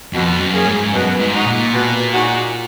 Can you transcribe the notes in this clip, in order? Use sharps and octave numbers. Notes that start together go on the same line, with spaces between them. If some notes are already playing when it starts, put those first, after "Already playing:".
F2 B2
F#2
A#3 C#4 G#4
G#2
F#2 B2
G#2
G#3 D#4 F#4
A#2
B2
G#3 D#4 F#4